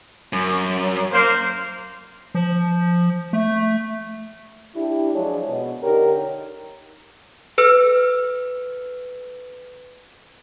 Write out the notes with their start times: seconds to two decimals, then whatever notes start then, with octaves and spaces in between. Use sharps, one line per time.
0.33 F#2
1.13 A#3 C5
2.35 F3
3.33 A3
4.76 D4 E4 G4
5.14 F3 F#3 G#3 D4 G#4 C#5
5.48 B2
5.83 D3 D#4 G4 A#4 C#5
7.58 A4 B4 E6 F6